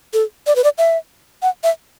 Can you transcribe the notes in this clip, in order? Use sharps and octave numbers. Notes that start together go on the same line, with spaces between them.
A4
D5
B4
D5
E5
F#5
E5